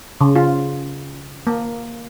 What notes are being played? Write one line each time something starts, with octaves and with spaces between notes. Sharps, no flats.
C#3
F4
A#3